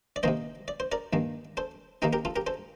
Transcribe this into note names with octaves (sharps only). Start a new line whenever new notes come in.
D5
C3 D#3 A#3 C5 D#5
D5
C5
A#4 D5
G2 D#3 A#3
A4 C5
D#3 A#3 D#4 G4 A#4
G4 A#4
F4 A4
G4 A#4
A4 C5